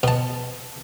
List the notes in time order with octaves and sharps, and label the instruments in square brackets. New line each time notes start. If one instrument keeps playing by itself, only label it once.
[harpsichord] B2 A5